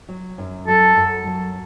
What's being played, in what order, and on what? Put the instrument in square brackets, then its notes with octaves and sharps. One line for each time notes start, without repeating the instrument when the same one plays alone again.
[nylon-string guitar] F#3
F#2
[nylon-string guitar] F#3 [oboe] A4
[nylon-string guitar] F#2
F#3